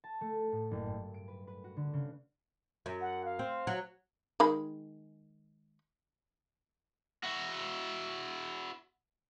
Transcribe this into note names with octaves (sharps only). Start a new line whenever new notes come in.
A5
A3
A2
F#1
G2
D7
B4
B4
F#4
D3
C#3
F#2
F#5
F5
C4
F#3
D#3 G#3 B5
E4 F#4